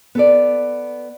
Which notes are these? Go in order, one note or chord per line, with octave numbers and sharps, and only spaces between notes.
B3 A4 D5